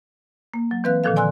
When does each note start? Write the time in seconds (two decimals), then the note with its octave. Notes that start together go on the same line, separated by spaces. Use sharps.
0.54 A#3
0.71 F#3
0.84 E3 C4 B4 F5 F#6
1.04 A#2 D3 D#3 F3 A4 F5
1.16 D5 G#5 C6 E6 F#6